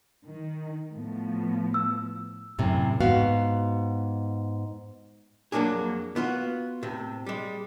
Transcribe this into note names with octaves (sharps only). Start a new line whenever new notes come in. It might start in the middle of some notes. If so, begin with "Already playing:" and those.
D#3
A2 F3 B3
E6
F#2 A2 C3
G#2 B3 F#4 F5
F2 F#3 A#3 D4 G#4
B3 F4 F#4
A2 C3
G3 G#3